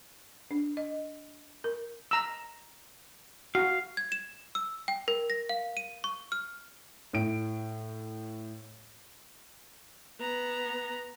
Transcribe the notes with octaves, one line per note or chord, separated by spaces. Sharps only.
D4
D#5
A#4
A#5 E6
F#4 F5
G#6
E7
E6
G5
A#4
A#6
F5
D#7
C#6
F6
A2 D7
B3 A#5